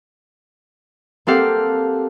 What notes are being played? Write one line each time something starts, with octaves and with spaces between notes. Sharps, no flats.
A#3 C4 G4 A4 F5 F#5